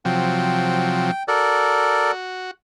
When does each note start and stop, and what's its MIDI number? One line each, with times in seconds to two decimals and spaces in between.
0.05 1.11 48
0.05 1.11 53
0.05 1.11 54
0.05 1.23 79
1.28 2.51 66
1.28 2.11 69
1.28 2.11 70
1.28 2.11 74